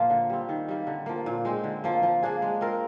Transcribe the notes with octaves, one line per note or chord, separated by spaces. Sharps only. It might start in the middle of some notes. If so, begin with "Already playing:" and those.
Already playing: A#2 F3 A#3 F4
D3
G3 C4
D#3
G3 A#3
D3
F3 A#3
A#2
G#3 C4 D#4
D3
F3 A#3
F3
A#3 D4 G#4
G#3
C4 F4 A#4